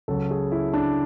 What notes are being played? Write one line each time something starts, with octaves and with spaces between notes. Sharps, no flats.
C#2 C#3 F#3 A4
G#4
E4
D4